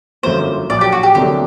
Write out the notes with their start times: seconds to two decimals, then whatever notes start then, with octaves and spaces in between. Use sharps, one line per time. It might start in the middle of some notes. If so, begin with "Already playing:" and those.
0.23 G1 F#2 F#3 A#3 C5
0.70 A#1 A#2 F#3 D5
0.81 G4
0.92 F#4
1.03 G4
1.15 D2 C3 F#3 A#3 D4 G4